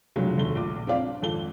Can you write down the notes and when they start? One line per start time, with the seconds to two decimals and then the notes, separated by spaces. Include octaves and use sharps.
0.16 F1 C#2 D3 F#3 G#4
0.38 F1 D#2 A3 G7
0.56 A#1 D6
0.87 C4 F4 D5 F5
1.00 D4
1.22 G#1 F2 A4 G7